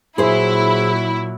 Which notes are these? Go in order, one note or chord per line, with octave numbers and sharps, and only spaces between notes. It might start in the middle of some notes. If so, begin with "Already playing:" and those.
A#2 F#3 E4 G#4 C5